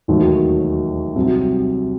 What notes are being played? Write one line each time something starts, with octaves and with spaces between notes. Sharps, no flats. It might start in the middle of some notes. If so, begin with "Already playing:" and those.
E1 D#2 D#3 F#3 A3
C2 C3 F#3 C4 D#4